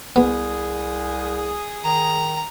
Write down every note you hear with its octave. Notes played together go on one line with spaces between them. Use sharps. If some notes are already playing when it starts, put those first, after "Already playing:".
C2 B3 G#4
D#3 A#5